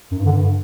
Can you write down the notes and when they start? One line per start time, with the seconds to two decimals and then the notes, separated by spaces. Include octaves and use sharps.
0.11 F#2
0.18 G2
0.25 D3
0.32 G2